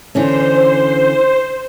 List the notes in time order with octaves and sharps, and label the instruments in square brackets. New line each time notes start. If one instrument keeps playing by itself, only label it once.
[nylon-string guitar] D3 E3 C#4 [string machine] C5